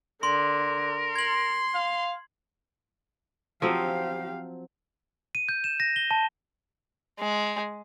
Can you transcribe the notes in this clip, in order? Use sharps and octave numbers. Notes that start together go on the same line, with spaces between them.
D3 A#4 C6
C6 G#6 F#7
F5
F3 F#3 C4 G4 F5
D#7
G6
E7
A#6
G7
A5
G#3